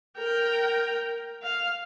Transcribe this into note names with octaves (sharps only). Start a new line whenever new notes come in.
A#4 G5
F5